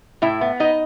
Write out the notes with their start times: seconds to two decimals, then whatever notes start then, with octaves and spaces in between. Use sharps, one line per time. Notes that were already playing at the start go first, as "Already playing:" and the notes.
0.22 A2 E4
0.41 B3
0.60 D#4 D#5